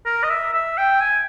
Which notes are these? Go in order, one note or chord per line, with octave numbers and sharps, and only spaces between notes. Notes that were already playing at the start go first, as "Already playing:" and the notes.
A#4
D#5
E5
E5
G5
G#5